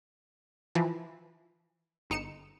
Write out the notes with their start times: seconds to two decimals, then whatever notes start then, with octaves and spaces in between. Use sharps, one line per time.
0.75 E3 F3
2.10 G1 D#4 C#7 E7